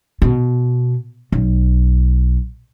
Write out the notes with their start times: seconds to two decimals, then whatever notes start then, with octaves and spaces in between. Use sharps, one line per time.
0.22 B2
1.32 B1